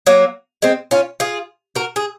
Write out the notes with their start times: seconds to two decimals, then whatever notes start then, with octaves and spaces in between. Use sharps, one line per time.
0.06 F#3 A#3
0.62 G#3 C4
0.91 C#4 F4
1.20 F4 G#4
1.75 F#4 A#4
1.96 G#4